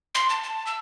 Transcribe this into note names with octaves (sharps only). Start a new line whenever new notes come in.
C6
A5
A5
E6